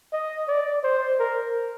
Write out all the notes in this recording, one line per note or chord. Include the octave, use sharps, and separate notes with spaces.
D#5
D5
C5
A#4